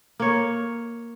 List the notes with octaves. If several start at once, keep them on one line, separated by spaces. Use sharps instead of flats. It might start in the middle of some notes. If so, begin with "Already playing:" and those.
A#3 C#5